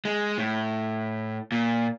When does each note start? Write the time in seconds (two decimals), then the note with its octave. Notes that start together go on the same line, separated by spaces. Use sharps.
0.05 G#3
0.38 A2
1.52 A#2